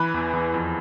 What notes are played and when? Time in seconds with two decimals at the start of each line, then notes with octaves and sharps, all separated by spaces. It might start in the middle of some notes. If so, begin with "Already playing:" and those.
Already playing: E3 B4 B5
0.14 E2
0.33 E2
0.54 F2